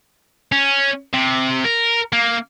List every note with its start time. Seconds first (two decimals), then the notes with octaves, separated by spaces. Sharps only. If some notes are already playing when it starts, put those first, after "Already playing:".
0.52 C#4
1.13 C3
1.64 A#4
2.13 A#3